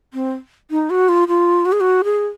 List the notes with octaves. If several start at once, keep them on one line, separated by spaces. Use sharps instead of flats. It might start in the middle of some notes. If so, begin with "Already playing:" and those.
C4
D#4
F#4
F4
F4
F#4
G#4
F#4
G#4